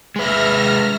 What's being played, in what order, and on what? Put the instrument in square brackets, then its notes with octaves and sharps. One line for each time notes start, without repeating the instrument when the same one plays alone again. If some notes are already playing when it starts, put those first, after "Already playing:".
[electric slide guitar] G#3 B4 [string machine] E5 F6 A#6